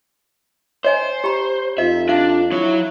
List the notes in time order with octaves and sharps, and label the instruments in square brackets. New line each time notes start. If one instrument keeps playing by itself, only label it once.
[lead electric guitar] C5 [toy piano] C#5 D#5 G#5
[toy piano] G4 A#5 B5
[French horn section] F2 D#4 F4 [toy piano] D#5 [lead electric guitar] E5
[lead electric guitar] D4 [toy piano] F5
[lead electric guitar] F#3 C#5 [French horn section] E4